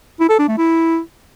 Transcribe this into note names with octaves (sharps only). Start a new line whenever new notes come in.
E4
A4
D4
A3
E4